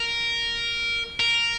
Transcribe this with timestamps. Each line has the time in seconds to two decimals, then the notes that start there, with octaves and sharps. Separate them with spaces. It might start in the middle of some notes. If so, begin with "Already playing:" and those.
Already playing: A#4
1.20 A#4